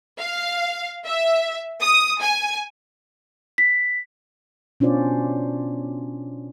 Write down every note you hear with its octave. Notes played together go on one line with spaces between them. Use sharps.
F5
E5
D#6
G#5
B6
B2 C#4 D4 F4 C5 D5